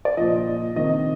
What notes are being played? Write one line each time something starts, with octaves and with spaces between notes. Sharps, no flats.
D5
A#2 F3 D#5
A#2 F3
C3 D#3 D#5